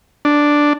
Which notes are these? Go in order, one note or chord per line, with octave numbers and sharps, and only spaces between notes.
D4